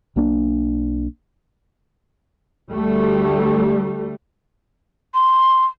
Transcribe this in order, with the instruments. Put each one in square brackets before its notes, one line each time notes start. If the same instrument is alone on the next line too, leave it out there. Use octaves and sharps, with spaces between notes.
[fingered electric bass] B1 A#3 D4
[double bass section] D2 G3 A3
[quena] C6